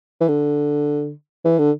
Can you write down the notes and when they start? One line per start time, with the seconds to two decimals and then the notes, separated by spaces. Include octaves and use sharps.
0.21 E3
0.28 D3
1.45 E3
1.58 D3